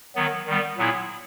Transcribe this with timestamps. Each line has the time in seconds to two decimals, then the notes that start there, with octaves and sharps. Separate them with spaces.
0.15 D#3 F#3 B3
0.46 D#3 G3 B3
0.78 A#2 F#3 B3 E4 G#4